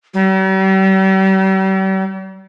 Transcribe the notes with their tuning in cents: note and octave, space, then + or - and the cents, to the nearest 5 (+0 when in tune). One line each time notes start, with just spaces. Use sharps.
G3 -40